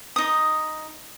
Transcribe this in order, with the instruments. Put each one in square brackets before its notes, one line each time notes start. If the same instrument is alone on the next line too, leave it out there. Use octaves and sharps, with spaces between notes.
[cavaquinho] D#4 D#6